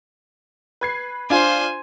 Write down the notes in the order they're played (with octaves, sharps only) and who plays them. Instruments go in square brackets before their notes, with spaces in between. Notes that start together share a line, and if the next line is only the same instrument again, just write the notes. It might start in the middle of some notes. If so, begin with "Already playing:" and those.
[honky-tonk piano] B4 G#6 C7
[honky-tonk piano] D4 F4 [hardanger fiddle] C5 G#5